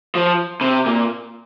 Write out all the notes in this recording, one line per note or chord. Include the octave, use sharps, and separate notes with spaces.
F3
C3
A#2